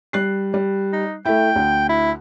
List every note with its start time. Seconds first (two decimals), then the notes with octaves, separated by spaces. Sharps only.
0.13 G3 F#6 C7
0.54 G3
0.93 D#4
1.25 A3 E4 G5
1.56 D2
1.89 E4